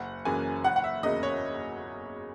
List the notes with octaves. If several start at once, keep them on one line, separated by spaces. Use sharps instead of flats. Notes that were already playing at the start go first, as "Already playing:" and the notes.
Already playing: F#1 F#5
F#2 C#3 E3 A#3 G#5
F#1 F#5
F#5
E5
E2 C#3 F#3 A#3 D#5
C#5